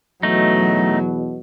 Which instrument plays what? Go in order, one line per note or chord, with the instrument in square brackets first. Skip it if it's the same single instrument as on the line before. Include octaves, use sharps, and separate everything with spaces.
[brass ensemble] E2 B2 [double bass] F#3 [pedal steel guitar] A3 D#4